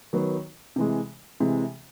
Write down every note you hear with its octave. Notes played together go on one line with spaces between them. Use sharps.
D#3 F#3 B3
C3 E3 G#3
C3 E3 G#3